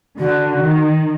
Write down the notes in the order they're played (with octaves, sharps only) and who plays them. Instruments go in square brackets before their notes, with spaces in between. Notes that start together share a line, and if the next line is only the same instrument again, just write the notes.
[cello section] D3 [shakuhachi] F#4
[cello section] D#3